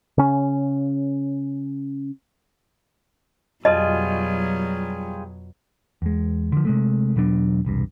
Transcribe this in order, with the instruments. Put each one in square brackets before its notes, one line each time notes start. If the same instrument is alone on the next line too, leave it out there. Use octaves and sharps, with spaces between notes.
[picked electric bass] C#3 C#4
[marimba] F2 [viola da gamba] B2 F#3 [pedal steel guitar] G3 F4 G#4 [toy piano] D#5
[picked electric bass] E2 G#3
D3 F3
C3 G#3 A3
E1 B2 F#3 D4
E1 C2 G2